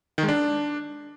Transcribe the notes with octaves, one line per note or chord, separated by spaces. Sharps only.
D#3
G#3
D4